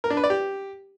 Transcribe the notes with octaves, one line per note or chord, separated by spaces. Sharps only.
A#4
D4
B4
D5
G4